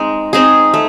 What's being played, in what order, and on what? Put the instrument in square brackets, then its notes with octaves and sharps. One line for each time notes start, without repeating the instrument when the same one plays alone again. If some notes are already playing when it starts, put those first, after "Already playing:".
Already playing: [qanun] G#3 C4 D#4
C4 D#4 G#4
A3